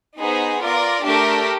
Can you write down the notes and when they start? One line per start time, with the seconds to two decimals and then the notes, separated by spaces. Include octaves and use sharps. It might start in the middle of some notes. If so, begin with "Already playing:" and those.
0.19 B3 D#4 G#4 C5
0.62 F4 A#4 D5
1.05 A3 D4 G4 A#4